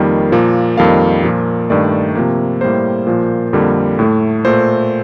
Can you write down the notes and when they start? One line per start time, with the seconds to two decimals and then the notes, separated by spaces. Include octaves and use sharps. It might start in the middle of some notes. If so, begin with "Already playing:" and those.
Already playing: F2 D#3 G3 A#3
0.32 A#2 F3 A#3
0.77 F2 D#3 G3 A#3 F5
1.24 A#2 F3 A#3
1.70 G2 D#3 A3 D5
2.15 C3 F3 A#3
2.61 A2 G3 A#3 C5
3.07 A#2 F3 A#3
3.53 F2 D3 G3 A#3
3.99 A2 A3
4.45 A#2 A3 C5